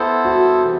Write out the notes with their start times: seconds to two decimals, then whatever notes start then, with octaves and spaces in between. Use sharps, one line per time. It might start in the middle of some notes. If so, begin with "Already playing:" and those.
Already playing: B3 E4 A4 C5
0.25 F#4
0.63 C3 E3